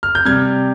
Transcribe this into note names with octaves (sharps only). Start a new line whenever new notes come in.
F6
G6
C3 G3 F6 G#6